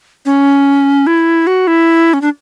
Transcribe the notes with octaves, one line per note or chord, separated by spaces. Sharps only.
C#4
E4
F#4
E4
C#4
D4